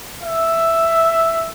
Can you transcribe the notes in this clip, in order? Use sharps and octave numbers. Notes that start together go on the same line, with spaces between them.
E5